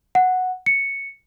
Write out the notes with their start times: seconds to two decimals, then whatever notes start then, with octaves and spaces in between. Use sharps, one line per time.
0.15 F#5
0.66 C#7